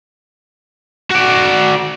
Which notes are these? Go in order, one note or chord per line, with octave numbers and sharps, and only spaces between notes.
F#4 D5